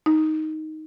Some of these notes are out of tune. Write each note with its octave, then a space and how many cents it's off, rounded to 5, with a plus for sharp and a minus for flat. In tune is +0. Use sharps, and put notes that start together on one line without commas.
D#4 +5